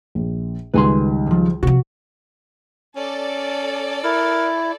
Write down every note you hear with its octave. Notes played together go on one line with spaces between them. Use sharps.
A#1
C#2 D#3 G3 B4 G#5 C6
D2 F3
C3 F3 F#4
C#4 A4 D5
E4 A#4